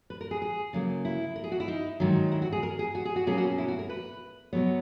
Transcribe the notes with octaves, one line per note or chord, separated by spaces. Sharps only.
B4
A#4
G#4
G#4
C#3 F#3 A#3
E4
A#4
G#4
F#4
E4
D#4
G#2 D#3 F#3
E4
F#4
G#4
A#4
G#4
F#4
G#4
F#4
B2 F#3 A#3 C#4 G#4
F#4
E4
F#4
A#4
B4
B2 F#3 B3 C#5